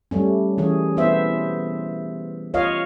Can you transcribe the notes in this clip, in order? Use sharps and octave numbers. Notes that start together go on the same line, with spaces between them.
G3 A3 C#4
E3 C#4 G#4
B3 E4 C5 E5
F4 C#5 D#5 F5